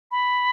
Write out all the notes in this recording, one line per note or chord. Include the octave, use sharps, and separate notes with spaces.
B5